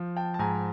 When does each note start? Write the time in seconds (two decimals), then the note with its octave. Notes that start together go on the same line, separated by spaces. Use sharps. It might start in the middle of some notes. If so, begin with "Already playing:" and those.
Already playing: F3
0.17 G5 A5
0.34 A5
0.39 G#2 G#5 A#5